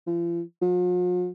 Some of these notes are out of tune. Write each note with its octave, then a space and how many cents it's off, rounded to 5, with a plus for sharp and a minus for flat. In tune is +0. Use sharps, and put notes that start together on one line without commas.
F3 -40
F3 +45